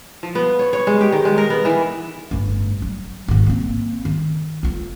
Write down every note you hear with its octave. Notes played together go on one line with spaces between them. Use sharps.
F3
B3
C#5
C#5
G#3
G4
D#3
G#3
A#4
B3
E3
G1 A2
F#3
G#1 B2
A#3 C4
D#3
D2 F4